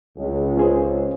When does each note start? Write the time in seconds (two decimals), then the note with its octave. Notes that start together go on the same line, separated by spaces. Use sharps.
0.17 C#2
0.57 C#4 G#4 C5